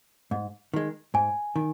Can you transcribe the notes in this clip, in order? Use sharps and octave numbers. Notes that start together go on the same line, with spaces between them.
G#2
D#3 G#3
G#2 G#5
D#3